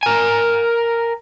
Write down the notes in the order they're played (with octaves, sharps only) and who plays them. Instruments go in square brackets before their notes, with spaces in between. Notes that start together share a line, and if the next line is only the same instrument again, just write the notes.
[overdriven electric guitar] A#4 G#5